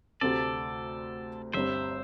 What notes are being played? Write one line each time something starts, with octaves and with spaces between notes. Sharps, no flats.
D2 C3 A3 C4 A4 D5
G1 G2 G3 C4 C5 E5